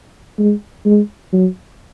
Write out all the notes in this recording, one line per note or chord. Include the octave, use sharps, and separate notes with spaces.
G#3
G#3
F#3